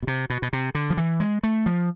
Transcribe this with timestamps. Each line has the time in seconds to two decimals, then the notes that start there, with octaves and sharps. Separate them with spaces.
0.03 B2
0.07 C3
0.30 B2
0.42 B2
0.53 C3
0.75 D3
0.90 F3
0.97 E3
1.20 G#3
1.43 A3
1.66 F3